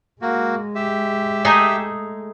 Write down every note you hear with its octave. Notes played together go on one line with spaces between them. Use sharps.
G#3 A#3 F#4
G4 E5
A3 D#4 G#4